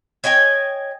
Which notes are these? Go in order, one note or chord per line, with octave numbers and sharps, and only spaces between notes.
C#5 D#5 G5 G#5